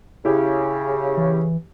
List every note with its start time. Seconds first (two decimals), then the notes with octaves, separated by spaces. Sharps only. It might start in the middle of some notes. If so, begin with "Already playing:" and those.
0.25 C#3 E4 G4
1.17 E3